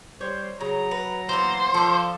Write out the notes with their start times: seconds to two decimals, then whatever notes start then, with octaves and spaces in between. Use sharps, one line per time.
0.21 G3 C5 C#5
0.61 C#3 F#3 A#5
0.91 B4
1.29 E3 A#3 B3 C5
1.74 F3 A4 D5